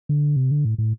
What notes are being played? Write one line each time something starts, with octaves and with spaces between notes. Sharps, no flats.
D3
C3
D3
A2
A2